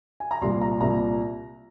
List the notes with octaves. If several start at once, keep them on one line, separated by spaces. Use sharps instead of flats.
G#5
A#5
C2 A#2 G3 C6
A#5
C2 A#2 G3 A#5